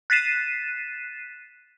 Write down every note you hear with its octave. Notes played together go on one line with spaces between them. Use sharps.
F#6 A6 B6 C7 D#7 E7